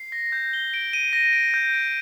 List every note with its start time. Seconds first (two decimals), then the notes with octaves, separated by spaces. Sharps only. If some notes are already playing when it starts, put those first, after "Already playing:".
Already playing: C7
0.12 A#6
0.32 G6
0.53 G7
0.74 D7
0.93 D#7
1.13 A#6
1.33 D7
1.54 G6
1.73 D7